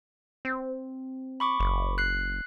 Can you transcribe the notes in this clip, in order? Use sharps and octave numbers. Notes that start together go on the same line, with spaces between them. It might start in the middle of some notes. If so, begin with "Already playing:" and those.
C4
B5 C#6 D6
F#1
F#6 C7